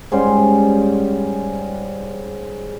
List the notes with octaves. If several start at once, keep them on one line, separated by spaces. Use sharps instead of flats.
G#2 G3 C#4 C6